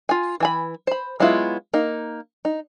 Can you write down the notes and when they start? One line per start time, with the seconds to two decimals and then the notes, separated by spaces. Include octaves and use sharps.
0.09 F4 G#5
0.40 E3 G#5 B5
0.87 C5 B5
1.20 F#3 G#3 B3 E4 F4
1.74 A#3 D#4
2.45 D#4